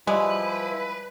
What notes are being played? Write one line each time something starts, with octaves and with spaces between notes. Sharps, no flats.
F3 G3 G#3 E4 B4 D5